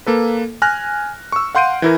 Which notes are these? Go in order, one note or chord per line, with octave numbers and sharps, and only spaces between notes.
A#3 A4 B4
G#5 F6 F#6 A#6
C#6 E6
F5 F#5 C6 G6 D7 D#7
E3 E4 A#4